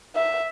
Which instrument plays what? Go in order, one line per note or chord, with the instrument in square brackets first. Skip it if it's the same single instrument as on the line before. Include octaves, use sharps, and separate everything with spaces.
[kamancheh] E5